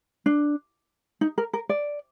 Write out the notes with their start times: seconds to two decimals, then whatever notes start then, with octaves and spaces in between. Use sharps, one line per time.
0.26 D4
1.21 D#4
1.38 A#4
1.53 A#4
1.69 D5